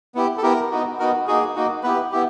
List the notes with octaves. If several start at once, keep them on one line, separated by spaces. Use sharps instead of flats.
B3 E4 G4
A4
B3 E4 G4 A#4
B3 D#4 F#4
B3 D#4 F#4 A#4
A#3 D#4 F#4 G#4
A#3 D#4 F#4
B3 E4 G4 B4
B3 E4 G4